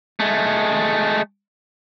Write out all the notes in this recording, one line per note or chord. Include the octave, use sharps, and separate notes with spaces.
G#3 A3